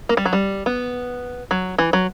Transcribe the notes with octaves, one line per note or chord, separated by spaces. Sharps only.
A#3
G3
F#3
G3
B3
F#3
E3
F#3